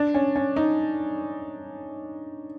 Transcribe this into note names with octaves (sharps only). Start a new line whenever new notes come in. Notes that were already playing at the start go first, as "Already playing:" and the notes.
Already playing: D4
C#4
C#4
D#4